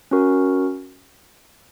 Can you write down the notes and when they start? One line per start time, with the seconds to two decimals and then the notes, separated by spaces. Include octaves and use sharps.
0.11 C#4 F#4 A#4